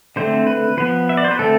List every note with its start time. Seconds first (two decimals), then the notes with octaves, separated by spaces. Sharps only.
0.16 D3 A3 C4 C5
0.47 B4
0.77 F3 B3 B4
1.09 E5
1.17 D5
1.24 C5
1.31 B4
1.39 D3 A3 C4 A4